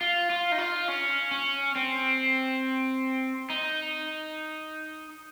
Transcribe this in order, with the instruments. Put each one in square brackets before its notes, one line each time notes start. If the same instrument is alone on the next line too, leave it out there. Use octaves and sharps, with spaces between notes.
[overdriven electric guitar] F4
F4
D#4
F4
C#4
C#4
C4
D#4